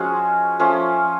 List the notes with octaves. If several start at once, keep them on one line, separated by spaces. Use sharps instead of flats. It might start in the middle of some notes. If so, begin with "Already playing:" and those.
Already playing: F3 G#3 C#4 F#4
F3 A3 C#4